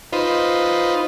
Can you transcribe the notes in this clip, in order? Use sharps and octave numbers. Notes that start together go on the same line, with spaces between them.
D#4 F4 B4 C5